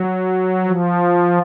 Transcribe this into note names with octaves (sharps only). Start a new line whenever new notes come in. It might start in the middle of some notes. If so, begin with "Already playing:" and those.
Already playing: F#3
F3